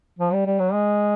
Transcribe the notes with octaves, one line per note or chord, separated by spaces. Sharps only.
F3
G3
G3
F#3
G#3